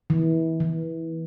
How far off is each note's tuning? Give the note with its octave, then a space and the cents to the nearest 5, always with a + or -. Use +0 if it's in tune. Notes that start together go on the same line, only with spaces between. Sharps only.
E3 -25
E3 -15